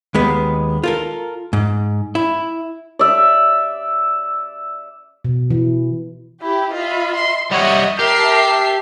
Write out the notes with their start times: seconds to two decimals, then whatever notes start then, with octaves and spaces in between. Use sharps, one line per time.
0.14 D#2 G#3 B3
0.84 F4 A4 A#4
1.53 G#2
2.15 E4
2.99 D5 E5
5.25 B2
5.50 E3
6.41 E4 G4
6.73 F4 D#5 E5 B5
7.16 C6
7.51 G3 C#5 D#5 E5 F#5
7.99 G4 A#4 E5 A5 C7